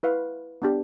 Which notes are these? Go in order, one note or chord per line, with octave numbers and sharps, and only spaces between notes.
E4 B4 F5
B3 D4 G4